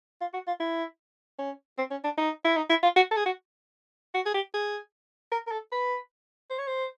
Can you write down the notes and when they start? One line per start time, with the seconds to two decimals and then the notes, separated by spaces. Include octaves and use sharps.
0.21 F4
0.34 F#4
0.47 F4
0.60 E4
1.39 C#4
1.78 C4
1.91 C#4
2.04 D4
2.18 D#4
2.45 E4
2.56 D#4
2.70 E4
2.83 F4
2.96 F#4
3.11 A4
3.16 G#4
3.26 F#4
4.15 F#4
4.26 G#4
4.34 G4
4.54 G#4
5.32 A#4
5.47 A#4
5.52 A4
5.72 B4
6.50 C5
6.59 C#5
6.67 C5